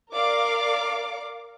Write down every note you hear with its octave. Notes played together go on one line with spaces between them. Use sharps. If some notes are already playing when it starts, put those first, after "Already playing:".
A#4 D5 F5 D6